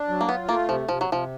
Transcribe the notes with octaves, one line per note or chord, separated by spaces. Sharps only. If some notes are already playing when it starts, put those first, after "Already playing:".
Already playing: D4
F#3
A#3
B3 F4
A3 A#3
C3 F3
C3 F3
F#3
C3 F3